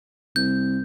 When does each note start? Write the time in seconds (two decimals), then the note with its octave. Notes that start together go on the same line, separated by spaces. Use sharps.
0.36 C2 G6